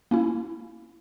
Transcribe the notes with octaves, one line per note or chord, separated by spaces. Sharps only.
A#3 C#4 E4